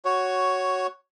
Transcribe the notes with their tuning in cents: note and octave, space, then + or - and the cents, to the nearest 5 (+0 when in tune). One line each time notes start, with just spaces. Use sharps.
F#4 +5 C#5 +0